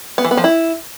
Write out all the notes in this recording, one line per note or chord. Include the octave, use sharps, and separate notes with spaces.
B3
E3
B3
F3
E4